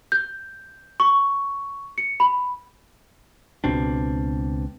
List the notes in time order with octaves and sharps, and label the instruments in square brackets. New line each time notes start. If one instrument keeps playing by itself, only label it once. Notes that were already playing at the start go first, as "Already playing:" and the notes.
[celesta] G6
C#6
C#7
B5
[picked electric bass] C#2 B2 C4 D4